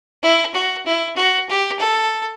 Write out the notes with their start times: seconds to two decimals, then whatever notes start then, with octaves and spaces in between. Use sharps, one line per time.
0.22 E4
0.54 F#4
0.86 E4
1.16 F#4
1.49 G4
1.79 A4